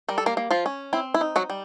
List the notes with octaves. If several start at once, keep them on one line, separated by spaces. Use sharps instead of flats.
G3 A#4
A4
A#3 A#4
A#3
F3 F4
C#4
C4 E4
E4
D#4
F#3 F#4
G3